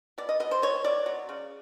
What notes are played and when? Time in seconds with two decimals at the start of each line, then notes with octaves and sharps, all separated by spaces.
0.18 B2 D5
0.29 D#5
0.40 B2 D#5
0.51 C5
0.62 B2 C#5
0.84 B2 D5
1.06 F#3
1.29 C#3